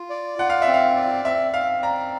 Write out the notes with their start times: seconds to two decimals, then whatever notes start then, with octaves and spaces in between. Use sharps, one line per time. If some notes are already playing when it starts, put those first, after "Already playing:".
Already playing: F4
0.10 D5
0.39 F4 F#5
0.50 F5
0.62 E5
0.67 C4
0.74 F5
0.96 D5
1.25 C4 E5
1.54 C4 F5
1.82 D5 A#5